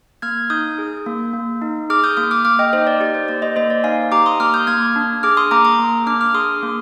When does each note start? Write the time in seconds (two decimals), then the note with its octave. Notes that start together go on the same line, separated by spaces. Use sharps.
0.22 A#3 F6 G#6
0.50 D#4 D#6 G6
0.78 G#4
1.06 A#3
1.34 A#3
1.62 D#4
1.90 G#4 D6 F6
2.04 D#6 G6
2.17 A#3 D#6 G6
2.31 D6 F6
2.45 A#3 D6 F6
2.59 D#5 G5
2.73 D#4 C5 D#5
2.87 D5
3.00 G4 D5
3.14 C5
3.28 A#3 D5
3.42 C5 D#5
3.56 A#3 C5 D#5
3.70 D5
3.84 D#4 F5 G#5
4.12 G4 A#5 D6
4.26 C6 D#6
4.40 A#3 D6 F6
4.54 D#6 G6
4.67 A#3 F6 G#6
4.96 D4
5.23 G#4 D6 F6
5.37 C6 D#6
5.51 A#3 A#5 D6
5.65 A#5 D6
5.79 A#3
6.06 D4 D6 F6
6.21 D6 F6
6.34 G#4 C6 D#6
6.63 A#3